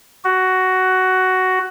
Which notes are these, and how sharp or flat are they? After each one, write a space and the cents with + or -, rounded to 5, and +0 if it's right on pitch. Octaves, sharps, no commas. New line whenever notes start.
F#4 +10